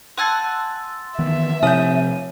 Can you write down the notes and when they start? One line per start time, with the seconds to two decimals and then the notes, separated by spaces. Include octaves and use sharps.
0.18 F#5 G#5 A5 C6 E6 A6
1.19 D#3 E3 B3 E5
1.63 C3 F3 C4 C#5 D#6 G6 D#7